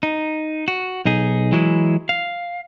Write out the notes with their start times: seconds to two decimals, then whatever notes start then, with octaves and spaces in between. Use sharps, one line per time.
0.03 D#4
0.68 F#4
1.05 B1 D#4 G#4
1.52 E3 F#3 G#3 E4
2.09 F5